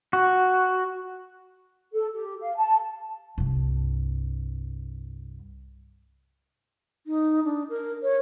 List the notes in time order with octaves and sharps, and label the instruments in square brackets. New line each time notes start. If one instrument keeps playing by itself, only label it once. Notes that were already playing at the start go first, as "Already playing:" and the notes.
[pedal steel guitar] F#4
[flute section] A4
G4
F5
A5
[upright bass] C2 G2
[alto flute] D#4
D4
A#4
C#5